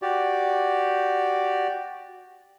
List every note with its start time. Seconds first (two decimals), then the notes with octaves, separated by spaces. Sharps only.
0.02 F#4 G4 D5